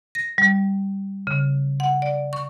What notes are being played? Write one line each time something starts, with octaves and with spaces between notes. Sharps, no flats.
A#6
G3
C#3
F#5
D5
C#6